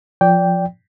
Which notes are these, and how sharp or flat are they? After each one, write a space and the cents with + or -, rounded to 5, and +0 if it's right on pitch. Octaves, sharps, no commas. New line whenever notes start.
F3 +10 D5 -20 G5 +0